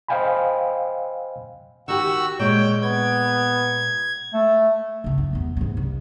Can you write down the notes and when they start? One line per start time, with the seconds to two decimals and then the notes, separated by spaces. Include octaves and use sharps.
0.08 C5 D#5 F5 G5 G#5 B5
1.88 D#3 F#4 G4 C#6 E6
2.39 A#2 G#3 C#5 G5
2.82 B3 G#6
4.33 A3
5.04 F#1 C#3
5.18 E4
5.33 E2 B3
5.57 G#2 E3
5.77 C2